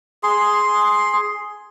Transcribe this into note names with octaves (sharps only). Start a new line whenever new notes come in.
G#4 C6